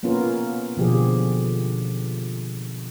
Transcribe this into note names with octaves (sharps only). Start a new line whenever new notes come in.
A#3 B3 C#4 F4 A#4
B2 D3 F3 G4 G#4